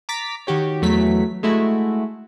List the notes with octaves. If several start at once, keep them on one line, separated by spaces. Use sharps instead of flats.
A#5 D6 A6 B6
D#3 F#4 G4 C#5
E2 F#3 A3 B6
G#3 A3 E4 F#4